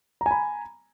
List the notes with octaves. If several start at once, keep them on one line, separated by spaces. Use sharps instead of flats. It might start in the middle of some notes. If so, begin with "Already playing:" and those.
G#5 A#5 B5